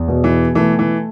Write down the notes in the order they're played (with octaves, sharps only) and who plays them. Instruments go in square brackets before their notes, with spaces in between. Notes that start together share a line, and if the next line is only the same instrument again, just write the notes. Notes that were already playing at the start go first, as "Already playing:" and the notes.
Already playing: [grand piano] E2
B2
[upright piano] E3
[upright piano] E3 [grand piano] A3
[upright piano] E3